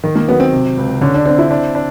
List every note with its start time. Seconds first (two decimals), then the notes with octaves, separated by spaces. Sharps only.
0.04 D#3
0.16 A#3
0.28 F#3 B3
0.40 C4
0.52 C3
0.78 C#2
1.01 D3 C#4
1.14 D4
1.25 C4 D4
1.39 E4
1.51 D4
1.75 D4